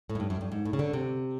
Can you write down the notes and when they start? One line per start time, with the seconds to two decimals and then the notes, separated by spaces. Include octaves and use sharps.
0.09 A2
0.15 G#2
0.20 G2
0.30 F#2
0.41 G2
0.52 G#2
0.65 A2
0.73 C#3
0.79 D3
0.93 C3